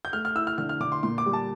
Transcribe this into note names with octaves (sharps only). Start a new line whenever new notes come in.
G6
A3 F6
F6
E4 E6
F6
D3 F6
F6
D3 D6
C6
A#2 C6
D6
G3
A5